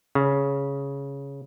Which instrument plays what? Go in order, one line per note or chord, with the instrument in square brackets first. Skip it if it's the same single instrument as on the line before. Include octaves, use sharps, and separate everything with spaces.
[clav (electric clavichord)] C#3